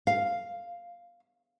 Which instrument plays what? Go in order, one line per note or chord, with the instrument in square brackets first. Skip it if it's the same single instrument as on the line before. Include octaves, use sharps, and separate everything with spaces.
[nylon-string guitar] F5